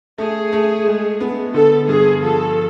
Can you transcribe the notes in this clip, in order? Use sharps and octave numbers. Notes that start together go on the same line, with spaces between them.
A3 G#4
A3
G#3
B3
D3 A4
G2 G#4
F3 A4